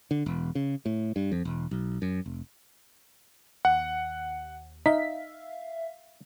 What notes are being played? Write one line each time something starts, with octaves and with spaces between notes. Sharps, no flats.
D3
E1
C#3
A2
G2
F2
E1
B1
F#2
F1
D#2 F#5
D#4 E5 F5 B6